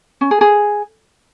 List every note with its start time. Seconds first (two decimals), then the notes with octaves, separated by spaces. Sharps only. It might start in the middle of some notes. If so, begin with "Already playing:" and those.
0.21 C#4
0.31 G#4
0.41 G#4